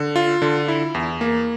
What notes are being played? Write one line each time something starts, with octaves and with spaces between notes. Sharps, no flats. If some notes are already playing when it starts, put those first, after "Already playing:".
Already playing: D3
F4
D3
E4
E2
A#3